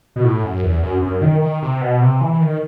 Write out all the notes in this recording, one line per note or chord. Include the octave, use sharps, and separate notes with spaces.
B2
A2
F#2
E2
F#2
F#2
D#3
D#3
C3
B2
C3
E3
D#3